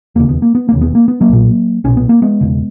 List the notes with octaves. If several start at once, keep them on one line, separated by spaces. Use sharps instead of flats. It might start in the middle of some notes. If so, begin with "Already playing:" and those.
E1 D#2 C#3 A#3
B3
A#3
B3
A#3
E1 D#2 C#3
B3
A#3
B3
F#3 A#3
B1 A#2
B1 A#2 C#4
B3
A#3
G#3 B3
E1 D#2 C#3